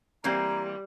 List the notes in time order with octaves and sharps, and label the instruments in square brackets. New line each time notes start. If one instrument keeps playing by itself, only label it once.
[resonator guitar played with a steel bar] E3 A#3 C4 [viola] G3 [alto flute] A#5